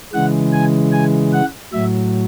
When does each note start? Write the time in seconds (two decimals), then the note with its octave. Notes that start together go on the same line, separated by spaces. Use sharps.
0.13 C#3 E3 G#3 F#5
0.53 G#5
0.92 G#5
1.33 F#5
1.72 A2 F#3 E5